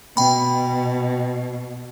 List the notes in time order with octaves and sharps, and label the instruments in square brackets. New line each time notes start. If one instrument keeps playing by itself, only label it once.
[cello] B2 [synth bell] G5 B5